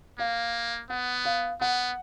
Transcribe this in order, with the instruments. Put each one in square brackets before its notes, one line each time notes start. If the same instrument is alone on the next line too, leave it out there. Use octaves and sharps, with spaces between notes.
[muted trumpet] A#3 [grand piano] F5
[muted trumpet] B3 [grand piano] F#5
[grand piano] F5
[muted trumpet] B3 [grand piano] F#5